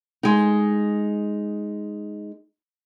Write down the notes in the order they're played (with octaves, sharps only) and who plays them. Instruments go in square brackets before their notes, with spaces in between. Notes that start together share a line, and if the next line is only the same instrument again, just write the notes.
[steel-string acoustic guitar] G#3 D#4